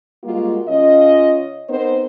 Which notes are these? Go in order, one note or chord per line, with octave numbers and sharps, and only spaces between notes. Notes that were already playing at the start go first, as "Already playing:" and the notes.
G3 G#3 A#3 F4 F#4
C#3 C#4 F4 D#5
B3 C4 D#4 A#4 C5